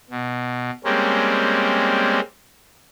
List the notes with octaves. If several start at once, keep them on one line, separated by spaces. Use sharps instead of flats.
B2
G3 G#3 A#3 C4 C#4